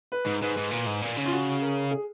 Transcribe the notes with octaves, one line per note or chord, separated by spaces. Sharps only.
B4
G#2
G#2 B4
G#2
A#2
G#2
A#2
C#3
F4
F#4
A#4
G#4